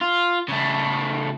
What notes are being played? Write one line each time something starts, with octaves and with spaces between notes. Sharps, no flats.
F4
C#3 A3